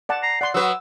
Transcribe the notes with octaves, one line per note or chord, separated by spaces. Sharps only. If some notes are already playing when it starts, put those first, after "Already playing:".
D5 F#5 A5
A#5 C7
D5 F#5 C6
F#3 B4 D#6 E6